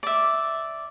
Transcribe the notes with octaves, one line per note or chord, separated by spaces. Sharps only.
D5 E5